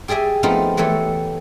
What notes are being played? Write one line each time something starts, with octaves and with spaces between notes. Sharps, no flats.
G4 G#4 D5 E5 G#5
F3 A3 B3 C4 D#4 F4
E3 A3 G4 A4 C#5